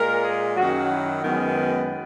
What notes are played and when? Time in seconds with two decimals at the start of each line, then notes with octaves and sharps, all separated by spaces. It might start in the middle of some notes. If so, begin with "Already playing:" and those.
Already playing: A#2 G#3 A#4
0.23 G#4
0.56 F#2 D#3 F#3 F#4
0.90 E4
1.23 F#2 D#3 G#3 B3